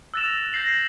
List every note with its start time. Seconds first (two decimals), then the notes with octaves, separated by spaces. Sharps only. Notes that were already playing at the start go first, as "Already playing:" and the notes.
0.14 E6 F#6 A6 A#6 E7 F7
0.53 G6 A#6 C7 F#7